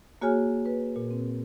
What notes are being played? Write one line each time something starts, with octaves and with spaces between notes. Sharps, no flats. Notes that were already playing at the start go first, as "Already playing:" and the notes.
A#3 F#4 G#4 C#5 G#5 F6
B4
A#2
C4